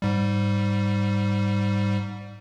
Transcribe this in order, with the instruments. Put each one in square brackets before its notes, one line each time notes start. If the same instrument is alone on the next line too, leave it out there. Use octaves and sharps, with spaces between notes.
[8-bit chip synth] G#2 G3